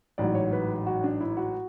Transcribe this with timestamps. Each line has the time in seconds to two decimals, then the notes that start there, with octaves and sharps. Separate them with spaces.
0.18 A1 G#2 F#3 D5
0.35 C#5
0.53 B4
0.87 F#4
1.04 D4
1.20 E4
1.37 F#4